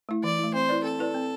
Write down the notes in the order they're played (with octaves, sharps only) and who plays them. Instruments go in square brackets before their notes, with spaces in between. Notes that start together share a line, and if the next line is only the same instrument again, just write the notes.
[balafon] A3 E4
[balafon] E3 [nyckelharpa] D5
[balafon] A3 E4
[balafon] C4 [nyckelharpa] C5
[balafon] E4 B4 D5
[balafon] C4 [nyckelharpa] A4
[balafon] E4 B4 D5
C4